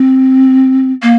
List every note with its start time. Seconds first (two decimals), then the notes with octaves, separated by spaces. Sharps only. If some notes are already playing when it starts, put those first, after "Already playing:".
Already playing: C4
1.03 A#3